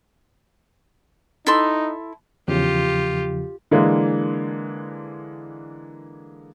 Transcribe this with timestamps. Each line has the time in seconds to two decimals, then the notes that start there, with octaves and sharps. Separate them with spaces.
1.47 D#4 E4 A4 C6
2.48 E2 C#3 F3 F4 G4
3.71 D3 E3 G#3 A#3 D4